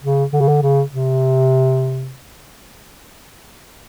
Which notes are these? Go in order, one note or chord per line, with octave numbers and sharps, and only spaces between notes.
C#3
D3
C#3
D3
C#3
C3